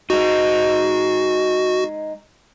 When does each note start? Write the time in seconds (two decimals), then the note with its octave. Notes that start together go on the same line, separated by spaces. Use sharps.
0.10 G#3 D#4 F#4